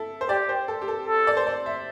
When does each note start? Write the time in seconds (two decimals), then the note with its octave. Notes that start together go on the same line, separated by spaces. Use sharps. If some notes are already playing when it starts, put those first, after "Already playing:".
Already playing: E4 A4
0.21 C5
0.29 G4 D5
0.49 C5
0.68 A4
0.82 G4
0.88 A4
1.07 A4
1.27 D5
1.37 C5
1.47 D5
1.66 E5